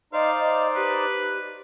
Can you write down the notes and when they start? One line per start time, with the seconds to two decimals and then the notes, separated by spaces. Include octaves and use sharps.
0.13 D#4 C5 D5 D#5 F5
0.39 D#5
0.76 G4 B4